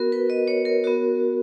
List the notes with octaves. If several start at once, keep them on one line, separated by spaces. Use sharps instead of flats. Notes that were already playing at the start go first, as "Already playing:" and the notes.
Already playing: B3 F#4 A#4
B4
D#5
C#5
A#4
B3 F#4